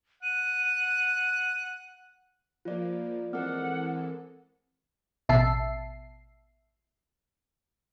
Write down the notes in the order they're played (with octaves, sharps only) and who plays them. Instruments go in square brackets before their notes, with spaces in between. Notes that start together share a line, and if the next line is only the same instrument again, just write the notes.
[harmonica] F#5 [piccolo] D#7
[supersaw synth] F3 A#3 [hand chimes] F4 D5
[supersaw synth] E3 G#3 A4 [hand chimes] C4 A#4 [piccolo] F#5
[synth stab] A1 B2 E5 A5 C7